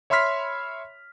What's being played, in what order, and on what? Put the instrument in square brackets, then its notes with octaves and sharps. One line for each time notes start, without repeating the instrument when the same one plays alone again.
[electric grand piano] C#5 E5 B5 C6 F6 B6